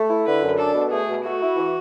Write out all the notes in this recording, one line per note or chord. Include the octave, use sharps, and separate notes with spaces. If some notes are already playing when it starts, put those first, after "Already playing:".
Already playing: A3
E4
D3 B4
F#2
D4 A4
B2
A3 G#4
B2
A3 F#4
E4
E3